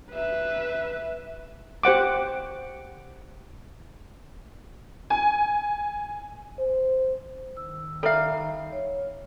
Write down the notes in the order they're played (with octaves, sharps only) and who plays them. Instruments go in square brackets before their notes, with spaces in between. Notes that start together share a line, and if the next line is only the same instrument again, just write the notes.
[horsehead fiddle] B4 E5
[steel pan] G4 C5 F#5 D6
[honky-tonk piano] G#5
[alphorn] C5
[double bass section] D#3 [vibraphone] E6
[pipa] G3 F5 [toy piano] A4 E5 [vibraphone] A#5
[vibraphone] C#5